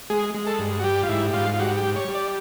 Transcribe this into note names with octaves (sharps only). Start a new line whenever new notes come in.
G#3 G#4
G#3
A4
G2
F#4
G3 G4
F4
G#2 E4
G#2 F4
F4
G3 F#4
G4
G3
C#5
G3
D5